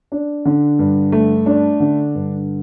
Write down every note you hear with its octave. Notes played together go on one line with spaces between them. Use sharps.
D4
D3
G2
A3
D4
D3
G2